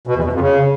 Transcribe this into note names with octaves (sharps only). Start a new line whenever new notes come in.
B2
E2
B2
F2
C#3